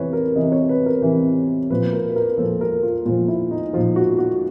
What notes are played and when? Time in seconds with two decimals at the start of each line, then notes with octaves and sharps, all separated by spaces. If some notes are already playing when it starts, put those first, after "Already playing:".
Already playing: C3 E3 B4 C#5
0.13 A#4
0.35 C3 E3 D#5
0.52 C#5
0.69 B4
0.86 A#4
1.02 C3 E3
1.70 A#2 F3 B4
1.93 A#4
2.09 B4
2.16 A#4
2.38 A#2 F3 A4
2.61 A#4
2.83 F4
3.05 A#2 F3 F4
3.28 E4
3.51 D#4
3.73 A#2 F3 F4
3.96 F#4
4.18 F#4